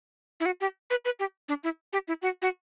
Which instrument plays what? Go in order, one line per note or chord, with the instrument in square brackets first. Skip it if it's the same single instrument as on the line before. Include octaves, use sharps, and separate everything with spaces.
[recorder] E4
F#4
G4
B4
B4
G4
D4
E4
G4
E4
F#4
F#4